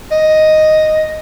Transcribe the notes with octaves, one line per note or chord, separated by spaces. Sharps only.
D#5